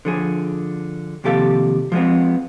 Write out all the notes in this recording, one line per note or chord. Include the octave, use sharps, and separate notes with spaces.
D3 F3 G#4
D#2 C3 F3 G4 A4 F5
F3 G#3 B3 C4